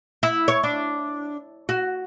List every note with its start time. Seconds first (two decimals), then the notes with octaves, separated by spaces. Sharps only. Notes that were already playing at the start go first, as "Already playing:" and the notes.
0.23 E4
0.48 C#5
0.63 D4
1.69 F#4